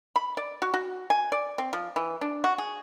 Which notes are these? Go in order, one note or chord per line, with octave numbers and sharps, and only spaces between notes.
B5
D5
F#4
F#4
G#5
D5
C4
F3
E3
D4
F#4
G#4